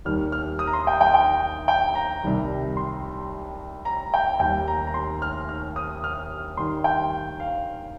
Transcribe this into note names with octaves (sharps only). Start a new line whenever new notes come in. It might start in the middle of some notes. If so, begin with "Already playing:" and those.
D#2 D#3 G3 F6
F6
D#6
A#5
C6
G5
G5
G5
G5
A#5
C2 C3 D#3 G3
C6
A#5
G5
D#2 D#3 G3 G5
A#5
A#5
C6
F6
F6
D#6
F6
G2 D#3 G3 C6
G5
F5